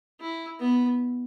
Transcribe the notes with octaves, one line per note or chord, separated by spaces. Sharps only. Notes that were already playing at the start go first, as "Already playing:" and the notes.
E4
B3